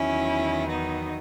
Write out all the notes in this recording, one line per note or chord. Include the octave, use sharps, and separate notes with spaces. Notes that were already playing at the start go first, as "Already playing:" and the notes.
Already playing: E2 D#3 F#3 C#4 E4
B3 D#4